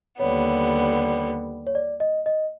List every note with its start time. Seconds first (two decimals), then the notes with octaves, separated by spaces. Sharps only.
0.19 D#2 D3 G3 B3 C#5
1.67 C#5
1.75 D5
2.00 D#5
2.26 D#5